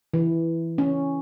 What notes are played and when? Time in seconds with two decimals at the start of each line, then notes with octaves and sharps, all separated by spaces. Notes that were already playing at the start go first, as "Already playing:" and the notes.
0.14 E3
0.78 C#4